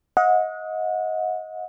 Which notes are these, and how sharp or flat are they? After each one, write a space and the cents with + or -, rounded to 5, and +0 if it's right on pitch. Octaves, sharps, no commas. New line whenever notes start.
D#5 +25 F#5 -30